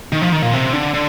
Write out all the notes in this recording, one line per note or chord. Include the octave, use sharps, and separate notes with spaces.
D#3
F3
D#3
A#2
C3
D3
D3